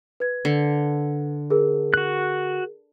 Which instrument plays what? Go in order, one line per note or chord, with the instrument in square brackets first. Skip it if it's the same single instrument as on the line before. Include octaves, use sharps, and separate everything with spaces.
[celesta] B4 G#6
[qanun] D3
[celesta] G#4 A#4
[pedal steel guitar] F#4 F#6